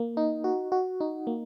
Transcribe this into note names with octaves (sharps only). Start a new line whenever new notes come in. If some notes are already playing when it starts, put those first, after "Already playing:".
Already playing: A#3
D#4
F#4
F#4
D#4
A#3